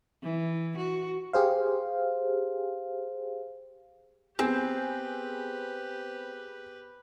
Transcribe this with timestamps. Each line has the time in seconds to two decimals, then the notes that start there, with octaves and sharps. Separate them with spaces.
0.23 E3
0.77 F#4
1.33 G4 G#4 C5 F5
4.39 B3 C4 G4 G#4 B4